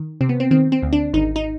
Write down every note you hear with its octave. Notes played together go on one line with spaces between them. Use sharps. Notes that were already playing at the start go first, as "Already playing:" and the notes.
Already playing: D#3
C3 C4
B3
C4
D#3 C4
C4
D2
D4
G#1 D#4
D#4